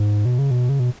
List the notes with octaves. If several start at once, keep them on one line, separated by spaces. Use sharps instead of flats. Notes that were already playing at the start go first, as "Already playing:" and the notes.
Already playing: G#2
B2
C#3
B2
C#3
B2